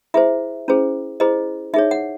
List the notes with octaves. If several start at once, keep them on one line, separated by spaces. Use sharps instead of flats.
E4 G#4 C5 E5
C#4 E4 G#4 C5
E4 G#4 C5 D#5
D#4 G#4 C#5 E5
F#5